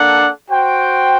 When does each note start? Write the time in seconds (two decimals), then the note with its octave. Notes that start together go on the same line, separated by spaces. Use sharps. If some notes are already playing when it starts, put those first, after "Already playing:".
Already playing: A#3 D4 A4 D5 F#5
0.50 F#4 C5 G5